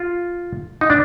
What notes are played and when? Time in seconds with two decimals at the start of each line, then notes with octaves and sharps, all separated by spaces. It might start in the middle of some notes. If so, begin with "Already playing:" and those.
Already playing: F4
0.81 D#4
0.90 D4